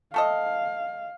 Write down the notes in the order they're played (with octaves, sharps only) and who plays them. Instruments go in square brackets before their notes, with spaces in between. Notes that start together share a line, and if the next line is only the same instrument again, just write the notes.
[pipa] A3 A4 D#5 [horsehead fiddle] F5